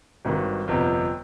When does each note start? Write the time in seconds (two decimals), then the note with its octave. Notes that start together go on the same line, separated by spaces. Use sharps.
0.25 G#1 G2 D#3
0.68 G1 F2 C3